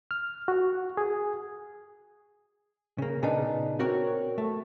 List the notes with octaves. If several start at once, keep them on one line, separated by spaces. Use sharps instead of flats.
F6
F#4
G#4
C#3 A#3
A#2 C#3 B3 D4 D#4
C4 F#4 A#4 C#5
A3